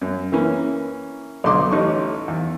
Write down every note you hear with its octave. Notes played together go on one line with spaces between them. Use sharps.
F#2
E3 A#3 C#4
B1 D3 C6 D6
A1 D#4 C#6
E2